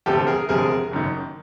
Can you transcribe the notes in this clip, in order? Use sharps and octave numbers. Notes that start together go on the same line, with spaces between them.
E1 D2 C3 F3 G4 A4
G#4 A#4
E1 D2 C3 F3 G#4 A#4
F#1 F#2 D#3